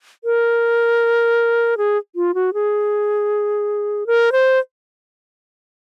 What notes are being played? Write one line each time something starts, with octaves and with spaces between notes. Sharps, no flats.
A#4
G#4
F4
F#4
G#4
A#4
C5